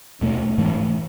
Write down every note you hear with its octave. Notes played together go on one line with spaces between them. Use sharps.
E2 B2 A3
G#2 E3 A3